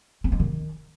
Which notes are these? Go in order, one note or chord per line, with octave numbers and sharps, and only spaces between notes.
C4
G#3
D#3